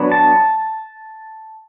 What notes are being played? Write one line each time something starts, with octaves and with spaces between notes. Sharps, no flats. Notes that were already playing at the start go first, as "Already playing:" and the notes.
Already playing: F#3 B3 D4
A5